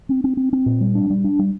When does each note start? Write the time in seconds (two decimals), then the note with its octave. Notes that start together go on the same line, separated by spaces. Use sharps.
0.09 C4
0.24 C4
0.37 C4
0.53 C4
0.66 A#2
0.81 G3
0.95 D4
1.10 G3
1.24 D4
1.39 G3